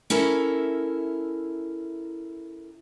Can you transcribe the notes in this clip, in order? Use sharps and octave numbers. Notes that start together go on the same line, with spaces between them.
C#4 E4 A4 A#4 E5